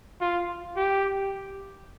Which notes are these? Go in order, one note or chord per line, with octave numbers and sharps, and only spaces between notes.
F4
G4